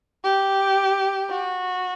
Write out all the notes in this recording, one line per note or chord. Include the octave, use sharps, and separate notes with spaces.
G4
F#4